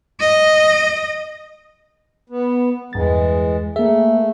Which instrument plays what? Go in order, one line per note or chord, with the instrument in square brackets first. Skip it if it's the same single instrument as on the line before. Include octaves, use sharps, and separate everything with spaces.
[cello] D#5
[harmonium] B3
[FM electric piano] E2 G2 A6 [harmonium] E3 G#3
[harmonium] A3 [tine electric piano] A#3 E5 [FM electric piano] G#4